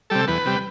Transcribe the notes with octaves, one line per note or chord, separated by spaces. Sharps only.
C3 G3 A4
E2 B4
C3 G3